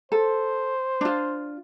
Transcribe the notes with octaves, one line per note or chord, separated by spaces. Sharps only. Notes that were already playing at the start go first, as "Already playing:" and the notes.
A4 C5
D4 F4